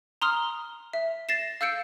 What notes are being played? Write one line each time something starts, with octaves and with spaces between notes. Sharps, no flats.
A#5 C6 D#6 F6
E5
A6 A#6 C7 E7
F5 E6 G6 C#7 D7